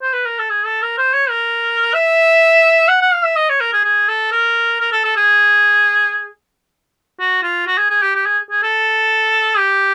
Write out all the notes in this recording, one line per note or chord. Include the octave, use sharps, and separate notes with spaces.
C5
B4
A#4
A4
G#4
A4
A#4
C5
C#5
A#4
E5
F#5
F#5
F5
E5
D#5
C#5
A#4
G#4
G#4
A4
A#4
A#4
A4
A4
G#4
F#4
F4
F#4
G#4
G#4
G4
G4
G#4
G#4
A4
G4